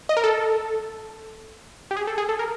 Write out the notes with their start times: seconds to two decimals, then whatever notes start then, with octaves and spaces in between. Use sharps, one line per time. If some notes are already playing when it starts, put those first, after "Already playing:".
0.09 D#5
0.17 A#4
0.24 A4
1.91 G4
1.97 G#4
2.07 A4
2.18 G#4
2.29 A4
2.39 A#4